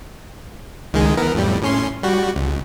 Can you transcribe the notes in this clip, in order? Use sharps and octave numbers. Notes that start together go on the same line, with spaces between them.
C#2 D#3 G#3
E3 B3 A#4
F2 A2 G3
A2 C#4 C6
G3 F#4
C#2